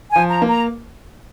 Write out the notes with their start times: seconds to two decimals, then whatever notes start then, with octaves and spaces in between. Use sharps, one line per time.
0.10 G#5
0.16 F3
0.28 A#5
0.42 A#3
0.48 A#5